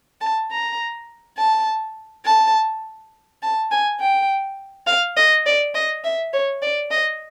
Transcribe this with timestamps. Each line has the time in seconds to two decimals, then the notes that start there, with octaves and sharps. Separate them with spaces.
0.21 A5
0.51 A#5
1.38 A5
2.25 A5
3.42 A5
3.71 G#5
4.00 G5
4.87 F5
5.17 D#5
5.46 D5
5.75 D#5
6.04 E5
6.33 C#5
6.62 D5
6.91 D#5